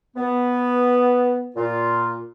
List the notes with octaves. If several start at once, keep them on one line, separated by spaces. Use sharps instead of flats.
B3
A#2 F4